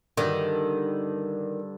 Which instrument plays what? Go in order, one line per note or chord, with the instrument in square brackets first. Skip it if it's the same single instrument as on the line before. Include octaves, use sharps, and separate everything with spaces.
[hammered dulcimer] G2 D3 [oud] D#3